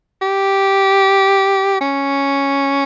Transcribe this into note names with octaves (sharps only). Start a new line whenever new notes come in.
G4
C#4